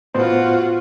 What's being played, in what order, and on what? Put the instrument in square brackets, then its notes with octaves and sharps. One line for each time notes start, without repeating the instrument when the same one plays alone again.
[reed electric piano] A2 B3 C5 [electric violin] F4 F#4